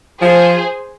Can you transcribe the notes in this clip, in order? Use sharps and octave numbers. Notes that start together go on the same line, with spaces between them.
F3 G#4 C5